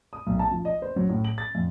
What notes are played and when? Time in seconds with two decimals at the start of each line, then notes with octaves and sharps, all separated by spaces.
0.13 D#6
0.27 B1
0.39 A5
0.51 F3
0.65 D#5
0.82 C5
0.96 F#3
1.09 A2
1.24 F#7
1.38 A6
1.55 F2